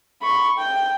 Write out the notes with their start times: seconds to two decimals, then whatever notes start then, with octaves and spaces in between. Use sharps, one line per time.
0.22 B5 C#6
0.58 G5